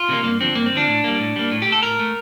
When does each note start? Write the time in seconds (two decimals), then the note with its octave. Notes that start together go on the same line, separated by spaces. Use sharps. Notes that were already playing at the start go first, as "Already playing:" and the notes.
Already playing: F4
0.09 C3 D#3 G3 A#3
0.24 G2 A#3
0.40 D3 F3 C4
0.55 G2 A#3
0.66 C4
0.72 D3 F3 D4
0.87 A2
1.04 G3 A#3
1.19 A2
1.36 G3 A#3
1.52 A2
1.62 G4
1.67 A3
1.72 A4
1.83 A2 A#4
1.99 A3